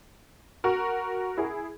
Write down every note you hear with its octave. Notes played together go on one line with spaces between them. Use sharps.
F#4 A#4
E4 G#4